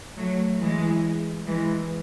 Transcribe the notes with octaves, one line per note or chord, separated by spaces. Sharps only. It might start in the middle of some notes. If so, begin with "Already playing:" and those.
F#3 A3
E3 G#3
E3 G#3